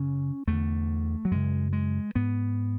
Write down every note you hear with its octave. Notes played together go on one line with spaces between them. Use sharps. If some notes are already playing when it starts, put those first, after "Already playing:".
Already playing: F#2 C#3 C#4
E2 D3 A3
F#3
F#2 C#3 G#3
G#3
G#2 B3